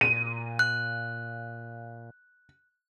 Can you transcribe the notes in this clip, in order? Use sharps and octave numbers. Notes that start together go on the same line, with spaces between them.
A#2 D#7
F#6